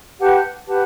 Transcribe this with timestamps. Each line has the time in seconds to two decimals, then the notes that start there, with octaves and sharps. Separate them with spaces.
0.20 G4 B4 F#5 A5
0.66 G4 B4 F#5 A5